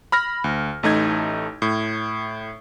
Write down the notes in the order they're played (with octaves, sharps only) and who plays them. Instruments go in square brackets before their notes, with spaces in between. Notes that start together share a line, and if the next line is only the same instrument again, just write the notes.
[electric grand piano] B5 F6 A#6
D2
A1 A3 D#4 G#6
A2